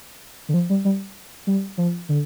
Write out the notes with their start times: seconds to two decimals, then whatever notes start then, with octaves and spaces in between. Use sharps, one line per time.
0.49 D3
0.54 F3
0.70 G3
0.85 G3
1.47 G3
1.78 F3
2.09 D3